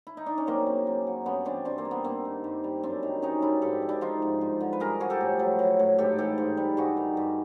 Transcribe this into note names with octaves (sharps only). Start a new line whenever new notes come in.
E4
D#4
D4
C#4
F#2 A#3 C4
C#3
F#2
F#3
G2 B3 C#4
E3 C4 D4
G2 C4 D4
A#3 C4
G3
B3
G2 A#3 C4
D#3
G2
G3
F#2 C4 D4
D#3
F#2 C#4 D#4
G3 D4 E4
G#2 G4 A4
F3
D4 E4
F3 D#4 F4
G#2
G2
D3
B4
G2 G#4 A#4
F3 F#4 G#4
G4 A4
A2
F#3
F#3
A2
G#2 G4 A4
E3 G4 A4
G#2
G3
G2 F#4 G#4
D#3
G2